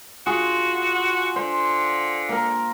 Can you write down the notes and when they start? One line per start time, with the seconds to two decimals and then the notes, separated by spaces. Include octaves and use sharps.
0.26 F4 F#4 G#4
1.36 D3 C5
2.29 A#3 A#4